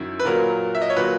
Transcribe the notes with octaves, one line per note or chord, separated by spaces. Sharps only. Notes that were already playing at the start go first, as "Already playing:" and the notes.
Already playing: F#2 D#3 F#3 E4
B4
A#2 F#3 A#4
E5
D#5
C#5
A#2 F#3 B4